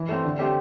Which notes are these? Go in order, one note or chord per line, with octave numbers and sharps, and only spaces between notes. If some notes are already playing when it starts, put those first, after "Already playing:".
Already playing: E3
A3 C4
D3
A3 C4 G4